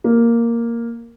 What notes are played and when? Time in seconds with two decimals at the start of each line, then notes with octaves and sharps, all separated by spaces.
0.04 A#3